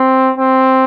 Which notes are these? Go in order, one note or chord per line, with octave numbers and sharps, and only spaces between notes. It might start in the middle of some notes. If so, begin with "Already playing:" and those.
Already playing: C4
C4